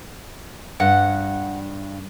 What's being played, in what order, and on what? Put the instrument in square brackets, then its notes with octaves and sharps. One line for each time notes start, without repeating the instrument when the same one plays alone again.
[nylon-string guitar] G2 [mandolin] F#5